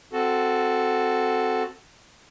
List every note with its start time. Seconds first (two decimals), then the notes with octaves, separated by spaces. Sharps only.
0.13 C4 F#4 A4